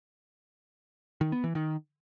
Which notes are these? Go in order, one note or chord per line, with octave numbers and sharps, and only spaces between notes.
D#3
B3
E3
D#3